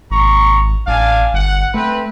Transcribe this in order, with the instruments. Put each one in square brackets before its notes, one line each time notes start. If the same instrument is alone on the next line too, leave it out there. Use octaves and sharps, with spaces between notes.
[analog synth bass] G#1 [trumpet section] A#5 C#6
[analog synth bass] A1 [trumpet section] D4 F5 G#5
[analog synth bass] G1 [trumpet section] F#5
[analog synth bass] A3 [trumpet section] C4 B4